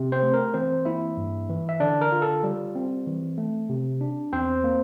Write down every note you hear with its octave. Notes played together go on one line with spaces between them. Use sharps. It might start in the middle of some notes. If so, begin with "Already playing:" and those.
Already playing: C3
C4 C5
A3
A#4
E3 C4 C5
A#3 E4 E5
G2
E3
E5
D3 D4 D5
A#4
F4
A4
G3
C4
E3
A3
C3
D4
E2 C4 C5
A#3